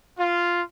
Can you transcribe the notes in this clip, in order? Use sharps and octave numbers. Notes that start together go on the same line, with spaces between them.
F4